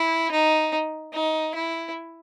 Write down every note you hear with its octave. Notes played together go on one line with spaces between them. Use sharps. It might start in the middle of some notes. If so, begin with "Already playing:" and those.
Already playing: E4
D#4
D#4
E4